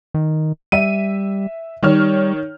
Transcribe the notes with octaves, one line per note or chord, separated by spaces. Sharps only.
D#3
G3 E5 D#7
D#3 G3 C#5 F6